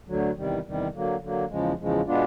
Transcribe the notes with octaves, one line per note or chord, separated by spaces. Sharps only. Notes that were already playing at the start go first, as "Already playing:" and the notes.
D2 D3 F#3
E2 C3 D#3 G3
E2 C3 D#3 G3
D3 F#3 A#3
D3 F#3 A#3
E2 C#3 F3 G#3
E2 C#3 F3 G#3
B2 G#3 B3 D4 F4